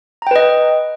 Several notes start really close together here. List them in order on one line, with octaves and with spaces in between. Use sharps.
A#5 G5 B4 D#5